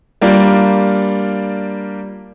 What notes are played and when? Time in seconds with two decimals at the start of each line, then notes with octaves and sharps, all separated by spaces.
0.21 G3 A#3 D4 F4